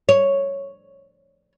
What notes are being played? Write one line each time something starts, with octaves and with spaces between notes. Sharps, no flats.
C#5